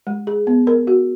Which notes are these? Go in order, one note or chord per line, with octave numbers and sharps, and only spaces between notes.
G#3
G#4
B3
A#4
F#4